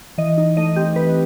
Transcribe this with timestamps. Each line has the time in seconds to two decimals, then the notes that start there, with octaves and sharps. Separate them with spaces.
0.18 E3 D#5
0.38 D#4
0.57 A3 D#5
0.76 C4 G4
0.96 E3 B4